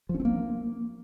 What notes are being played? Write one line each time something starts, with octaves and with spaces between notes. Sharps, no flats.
F3
C#4
C4
A#3